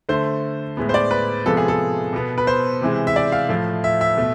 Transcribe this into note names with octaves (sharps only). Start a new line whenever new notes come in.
D3 A3 C5
A2 G#3 B3
C5
D5
B4
C3 F3 G#3 B3 A4
G#4
A4
B2 B3
B4
C5
C3 E3 G#3
E5
D5
F5
A2 F3 A3
E5
E5
B2 A3